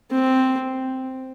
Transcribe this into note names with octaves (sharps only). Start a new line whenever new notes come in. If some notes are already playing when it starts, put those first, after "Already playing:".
C4